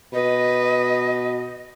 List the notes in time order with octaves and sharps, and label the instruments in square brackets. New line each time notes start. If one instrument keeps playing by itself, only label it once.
[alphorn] B2 [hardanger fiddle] B4 [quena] D#5